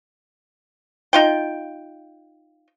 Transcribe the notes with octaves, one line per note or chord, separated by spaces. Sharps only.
D#4 F4 G5